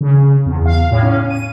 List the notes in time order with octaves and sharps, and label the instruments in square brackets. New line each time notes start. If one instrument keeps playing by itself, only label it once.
[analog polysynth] C#3
E2
F5
A2
C#4
D#7